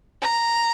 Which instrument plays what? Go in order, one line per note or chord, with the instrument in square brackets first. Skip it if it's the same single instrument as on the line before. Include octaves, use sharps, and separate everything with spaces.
[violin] A#5